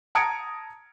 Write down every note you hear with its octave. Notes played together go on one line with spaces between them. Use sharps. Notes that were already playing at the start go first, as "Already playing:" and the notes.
A5 A#5 D#6 G#6 C#7 D7